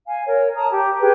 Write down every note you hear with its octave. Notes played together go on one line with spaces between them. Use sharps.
F5 G#5
A#4 C#5
A5 A#5 D#6
G4
G4 G#4 B4